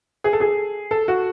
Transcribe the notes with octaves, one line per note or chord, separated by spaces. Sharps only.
G#4
A4
G#4
A4
F#4